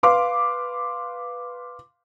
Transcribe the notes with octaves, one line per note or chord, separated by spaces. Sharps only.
B4 F5 C6 D6